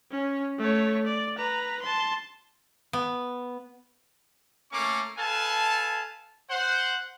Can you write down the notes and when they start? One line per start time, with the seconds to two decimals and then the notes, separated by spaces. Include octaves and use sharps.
0.11 C#4
0.59 A3 C#5
1.06 D5
1.38 B4 A#5
1.82 A5 C6
2.93 B3
4.72 A3 A#3 C#4 F5 C#6 D6
5.18 A4 B4 F5 G#5 A5
6.50 C5 F#5